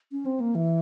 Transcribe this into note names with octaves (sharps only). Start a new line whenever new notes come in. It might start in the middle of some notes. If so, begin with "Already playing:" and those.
C#4
C4
A#3
E3